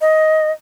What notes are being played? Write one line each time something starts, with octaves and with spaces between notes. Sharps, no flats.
D#5